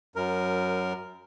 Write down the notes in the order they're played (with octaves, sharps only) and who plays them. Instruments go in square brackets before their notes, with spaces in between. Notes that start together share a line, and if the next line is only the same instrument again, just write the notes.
[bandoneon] F#2 A#4